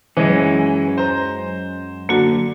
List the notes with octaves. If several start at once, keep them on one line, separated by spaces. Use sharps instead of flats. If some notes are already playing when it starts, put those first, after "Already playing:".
F#2 E3 G#3 C#4
C5 A#5
D3 A#3 F#4